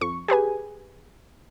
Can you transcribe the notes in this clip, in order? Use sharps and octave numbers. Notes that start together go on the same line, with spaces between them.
F2 C#6
G4 G#4 B4 G#5